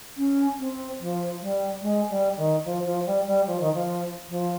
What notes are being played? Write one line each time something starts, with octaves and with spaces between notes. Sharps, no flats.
C#4
C4
F3
G3
G#3
G3
D#3
F3
F3
G3
G3
F3
D#3
F3
F3